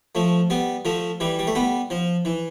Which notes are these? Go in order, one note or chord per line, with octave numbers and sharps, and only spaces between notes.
F3 A3
G3 B3
F3 A3
E3 G3
G3
A3
G3 B3
F3
E3